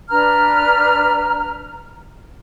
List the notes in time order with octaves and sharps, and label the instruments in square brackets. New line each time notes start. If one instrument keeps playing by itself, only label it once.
[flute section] D4 B4 A#5 F6